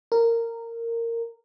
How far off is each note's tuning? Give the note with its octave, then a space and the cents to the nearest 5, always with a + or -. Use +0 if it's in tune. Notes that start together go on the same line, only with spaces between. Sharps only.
A#4 -15